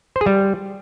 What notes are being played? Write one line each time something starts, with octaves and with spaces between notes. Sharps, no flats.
C5
G#4
G3